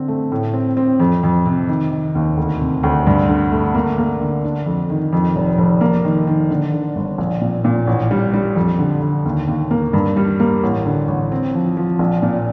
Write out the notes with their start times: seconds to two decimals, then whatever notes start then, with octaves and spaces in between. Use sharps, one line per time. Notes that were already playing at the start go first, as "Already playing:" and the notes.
Already playing: D3 C4
0.08 A3
0.32 A2
0.54 C4
0.77 C4
1.00 F2
1.23 F2
1.46 C3
1.68 D#3
1.92 D#3
2.15 D#2
2.37 D2
2.60 C3
2.83 D2
3.07 G2
3.29 D3
3.52 A3
3.75 A#3
3.98 A#3
4.21 D3
4.44 D4
4.66 F2
4.90 D#3
5.13 F2
5.36 F1
5.58 F1
5.81 A#3
6.05 D#3
6.27 D#3
6.51 D3
6.73 D3
6.96 G1
7.18 A#1
7.41 A#2
7.64 A#2
7.87 A1
8.11 G3
8.34 G3
8.56 F2
8.79 D3
9.02 D3
9.26 D#2
9.48 D#2
9.71 A#3
9.93 G2
10.17 G3
10.40 A#3
10.63 A1
10.86 D3
11.08 A1
11.32 C4
11.55 F3
11.77 F3
11.99 A#1
12.22 A#2